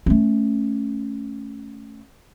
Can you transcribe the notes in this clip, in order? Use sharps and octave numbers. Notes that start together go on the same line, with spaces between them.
A3 C#4